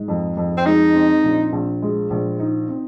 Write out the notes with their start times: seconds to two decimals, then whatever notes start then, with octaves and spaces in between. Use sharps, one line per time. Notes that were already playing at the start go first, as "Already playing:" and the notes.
Already playing: G#2
0.08 F2
0.37 F2
0.57 C4
0.66 G#3 D#4
0.95 C4
1.23 A#1
1.53 A#1
1.82 G#3
2.10 A#1
2.40 D#4
2.69 C4